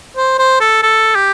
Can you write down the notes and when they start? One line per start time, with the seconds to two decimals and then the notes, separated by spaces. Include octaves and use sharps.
0.17 C5
0.39 C5
0.60 A4
0.83 A4
1.15 G4